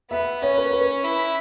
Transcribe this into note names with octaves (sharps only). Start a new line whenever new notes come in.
B3 E5
C#4 C#5
B4
B4
E4